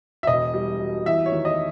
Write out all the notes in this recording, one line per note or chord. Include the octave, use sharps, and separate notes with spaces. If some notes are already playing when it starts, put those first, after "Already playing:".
E5
E1 D#5
G3
B2
E2 E5
C#5
D#3
D#5